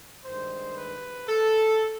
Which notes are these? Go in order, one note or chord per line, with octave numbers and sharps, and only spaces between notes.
G2 D#3 G#3 C5
B4
A4